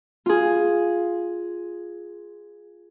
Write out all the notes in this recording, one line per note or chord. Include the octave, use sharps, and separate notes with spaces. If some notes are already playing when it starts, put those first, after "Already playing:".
F4 G#4